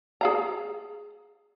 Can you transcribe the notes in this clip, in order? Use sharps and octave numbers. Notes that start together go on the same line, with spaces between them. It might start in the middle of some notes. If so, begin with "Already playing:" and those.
G#4 F5 A#5